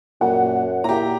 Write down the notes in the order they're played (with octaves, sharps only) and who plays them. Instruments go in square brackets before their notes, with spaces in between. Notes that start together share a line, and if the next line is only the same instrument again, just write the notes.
[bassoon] F#2 [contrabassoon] A#2 [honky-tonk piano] F#5
[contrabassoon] A#2 [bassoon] E4 [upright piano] G4 A#5